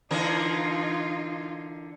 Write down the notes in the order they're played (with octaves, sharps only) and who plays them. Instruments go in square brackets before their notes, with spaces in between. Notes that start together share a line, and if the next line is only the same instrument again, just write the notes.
[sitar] D3 E3 A#4 [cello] D#4 F4